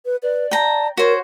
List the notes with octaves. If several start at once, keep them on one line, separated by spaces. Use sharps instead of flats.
B4
B4 D5
G5 A5 A#5
F#4 A#4 C5 C#5